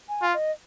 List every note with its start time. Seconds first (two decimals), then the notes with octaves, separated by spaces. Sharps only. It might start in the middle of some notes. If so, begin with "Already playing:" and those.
0.09 G#5
0.22 F4
0.34 D#5